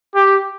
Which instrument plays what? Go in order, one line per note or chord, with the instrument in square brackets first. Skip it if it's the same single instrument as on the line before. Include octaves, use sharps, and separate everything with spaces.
[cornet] G4